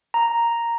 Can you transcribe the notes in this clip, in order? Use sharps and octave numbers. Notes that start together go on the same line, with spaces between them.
A#5